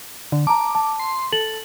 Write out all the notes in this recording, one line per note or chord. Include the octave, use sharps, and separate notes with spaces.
D3
A5 A#5 D6
A5
C6
A4 F#7